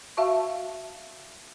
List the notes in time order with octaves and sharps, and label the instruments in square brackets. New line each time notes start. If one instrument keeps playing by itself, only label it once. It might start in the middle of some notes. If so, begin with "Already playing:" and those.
[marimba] F#4 E5 F5 A5 C#6